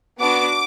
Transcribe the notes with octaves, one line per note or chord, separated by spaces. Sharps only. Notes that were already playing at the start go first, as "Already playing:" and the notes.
B3 D4 F#4 D6